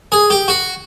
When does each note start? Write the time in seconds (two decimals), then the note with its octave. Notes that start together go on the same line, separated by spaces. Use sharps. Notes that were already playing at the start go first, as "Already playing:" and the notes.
0.12 G#4
0.30 G4
0.48 F#4